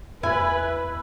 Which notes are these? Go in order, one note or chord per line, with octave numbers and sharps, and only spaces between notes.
E2 E4 B4 G#5